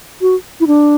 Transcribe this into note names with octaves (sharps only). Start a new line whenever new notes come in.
F#4
E4
D4